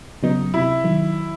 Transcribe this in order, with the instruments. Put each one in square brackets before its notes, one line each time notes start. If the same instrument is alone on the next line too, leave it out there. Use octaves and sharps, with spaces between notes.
[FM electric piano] C#3 F#3 B3 [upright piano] D#4
[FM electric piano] C3 [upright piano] E4
[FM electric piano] D#3 F#3